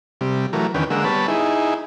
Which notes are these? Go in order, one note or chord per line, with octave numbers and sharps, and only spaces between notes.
C3 G3
E3 F#3 A3 A#4
E2 D3 D#3 C#4 B4 G5
D3 G#3 A#3 F#5 E6
G3 B3 C#5 A5 B5
D#4 E4 G#4